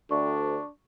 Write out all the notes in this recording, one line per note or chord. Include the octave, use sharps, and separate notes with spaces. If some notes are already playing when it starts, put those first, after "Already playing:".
D2 D4 C#6